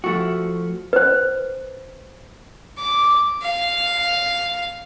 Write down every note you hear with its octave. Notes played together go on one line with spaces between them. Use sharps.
F3 A3 F#4
B4 C5
D6
F5